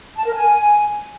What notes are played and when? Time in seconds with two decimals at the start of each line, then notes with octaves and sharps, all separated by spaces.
0.16 A5
0.25 A#4
0.35 G#5